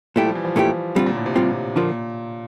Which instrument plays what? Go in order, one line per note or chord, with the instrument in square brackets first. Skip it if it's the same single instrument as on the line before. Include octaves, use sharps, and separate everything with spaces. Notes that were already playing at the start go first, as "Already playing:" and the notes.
[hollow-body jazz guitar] A#2 A3 E4 G4 [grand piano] G3
[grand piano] F3
E3
F3
[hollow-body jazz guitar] A#2 A3 E4 G4
[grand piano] D3 [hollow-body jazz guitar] G3 C4 F4
[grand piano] A#2
A2
C3
[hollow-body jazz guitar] G3 C4 F4
[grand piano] A#2 [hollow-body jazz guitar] D3 F3 A#3 F4